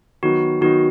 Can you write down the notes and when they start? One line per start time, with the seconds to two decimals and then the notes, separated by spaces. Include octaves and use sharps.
0.23 D#3 F#3 B3 D#4 F#4
0.61 D#3 F#3 B3 D#4 F#4